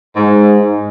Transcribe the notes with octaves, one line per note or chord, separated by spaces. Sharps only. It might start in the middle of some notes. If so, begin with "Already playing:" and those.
G#2